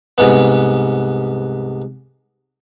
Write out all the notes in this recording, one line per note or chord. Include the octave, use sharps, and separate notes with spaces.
C2 G#2 B3